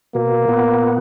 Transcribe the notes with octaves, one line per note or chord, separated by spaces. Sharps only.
B2 A#3
A#2 B3